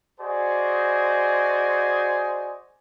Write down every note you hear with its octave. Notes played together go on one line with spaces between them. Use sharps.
F#4 G#4 C5 D5 D#5 G#5